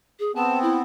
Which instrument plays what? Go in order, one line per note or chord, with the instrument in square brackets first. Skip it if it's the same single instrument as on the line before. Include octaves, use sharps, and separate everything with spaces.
[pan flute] G#4
[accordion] B3 C4 [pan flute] A5
[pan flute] E4